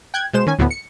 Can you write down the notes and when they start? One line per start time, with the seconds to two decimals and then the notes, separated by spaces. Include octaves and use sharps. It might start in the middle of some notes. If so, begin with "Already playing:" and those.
0.14 G5 F#6 G#6
0.33 B2 G#3 C5 E7
0.46 D#3 C#4 G#5
0.59 D2 A2 D3 B3
0.71 C#7